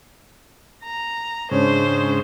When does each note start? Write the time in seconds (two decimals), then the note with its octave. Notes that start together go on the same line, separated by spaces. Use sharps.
0.84 A#5
1.51 G#2 C#3 G#3 C#4 D4 C5